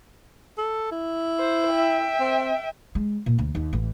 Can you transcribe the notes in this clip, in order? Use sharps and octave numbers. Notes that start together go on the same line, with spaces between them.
A4
E4
C5
E5 G5
C4
G#3
A#2
D2
D#2
A1